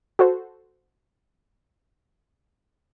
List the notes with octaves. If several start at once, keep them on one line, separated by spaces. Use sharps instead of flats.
F#4 A4 C5